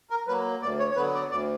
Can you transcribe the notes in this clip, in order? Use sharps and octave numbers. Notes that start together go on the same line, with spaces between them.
A#4
F#3 A#3 B4
D2 D5
C#5
C#5
D3 F#3 B3 B4
D5
D2 D5